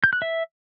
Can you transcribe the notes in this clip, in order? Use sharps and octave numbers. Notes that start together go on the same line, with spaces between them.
G6
F#6
E5